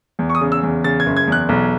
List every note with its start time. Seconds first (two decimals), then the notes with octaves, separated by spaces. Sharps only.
0.19 E2
0.30 C#6
0.35 D#6
0.41 C#3
0.52 E6
0.63 E2
0.84 C#3 A6
1.00 G#6
1.06 F#1
1.17 G#6
1.27 E2 F#6
1.49 B1